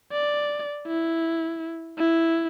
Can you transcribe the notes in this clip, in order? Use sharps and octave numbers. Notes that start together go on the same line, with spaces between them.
D5
E4
E4